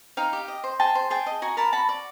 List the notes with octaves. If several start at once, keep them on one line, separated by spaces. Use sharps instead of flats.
D#4 F5 G5
G4
D#5
C5
G#4 G5 A5
C5
G#4 G5 A5
D#5
F#4 G#5 A#5
A#4 A5 B5
F#4 A5 B5
D5